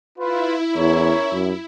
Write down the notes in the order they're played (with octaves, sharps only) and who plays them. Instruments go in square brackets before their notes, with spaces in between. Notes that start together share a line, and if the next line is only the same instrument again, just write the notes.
[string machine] E4 [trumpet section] F4 B4
[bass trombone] E2 [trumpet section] C#4 A#4 C#5
[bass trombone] F#2